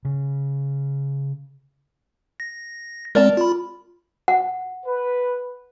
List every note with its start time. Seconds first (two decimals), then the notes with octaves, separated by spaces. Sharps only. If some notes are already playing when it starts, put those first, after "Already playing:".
0.05 C#3
2.40 A#6
3.15 G#3 C4 A#4 D5 A5
3.37 F4 B5
4.28 F#5
4.86 B4